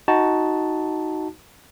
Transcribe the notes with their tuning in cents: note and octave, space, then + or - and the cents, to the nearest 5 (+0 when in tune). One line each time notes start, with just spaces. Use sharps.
D#4 +10 F#4 +0 A5 +0